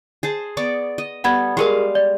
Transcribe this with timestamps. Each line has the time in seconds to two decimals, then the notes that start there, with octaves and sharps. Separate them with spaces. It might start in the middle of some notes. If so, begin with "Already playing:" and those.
0.23 G#4 C5 A5
0.57 B3 D5 C#6
0.98 D#5
1.24 G3 B3 A4 F#5 B5 G#6
1.57 G3 G#3 G4 G#4 A#4 F5
1.95 D5